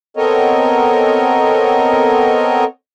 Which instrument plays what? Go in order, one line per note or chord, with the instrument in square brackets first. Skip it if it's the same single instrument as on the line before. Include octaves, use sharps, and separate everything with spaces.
[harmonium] B3 C4 A4 A#4 C#5 D#5